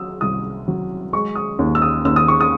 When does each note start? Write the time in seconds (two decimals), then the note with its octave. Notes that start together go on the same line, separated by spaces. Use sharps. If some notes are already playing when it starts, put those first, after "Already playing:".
Already playing: F#3 D#6 E6
0.21 C2 D#6
0.68 F#3
1.13 G#3 C#6
1.35 D#6
1.59 D#2
1.75 E6
1.82 D#6
2.05 D#2 E6
2.16 D#6
2.28 C#6
2.41 D#6